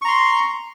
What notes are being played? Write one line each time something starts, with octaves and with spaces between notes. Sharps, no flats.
A#5 C6 C#6